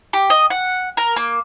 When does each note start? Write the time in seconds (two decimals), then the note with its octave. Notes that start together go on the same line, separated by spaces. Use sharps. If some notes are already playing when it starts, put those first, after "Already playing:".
0.13 G4
0.30 D#5
0.50 F#5
0.97 A#4
1.16 A#3